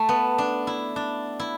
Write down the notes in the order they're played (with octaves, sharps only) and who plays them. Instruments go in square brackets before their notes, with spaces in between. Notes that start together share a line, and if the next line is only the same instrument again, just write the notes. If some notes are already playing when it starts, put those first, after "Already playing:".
Already playing: [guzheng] A3 [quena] A5
[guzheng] B3
D4
E4
D4
E4